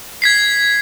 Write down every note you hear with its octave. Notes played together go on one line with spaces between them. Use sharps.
G#6 B6 C7